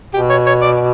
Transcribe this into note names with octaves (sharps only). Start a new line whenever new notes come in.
B2 G4
C#5
C#5
D5